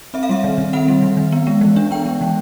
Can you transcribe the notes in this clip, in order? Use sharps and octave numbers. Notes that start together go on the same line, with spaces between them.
C4 E5
F5
G3 E5
D#3
D#3
C4 F#5
G3
D#3
D#3
B3
G#3
E3
D4
B3 G5
G#3
E3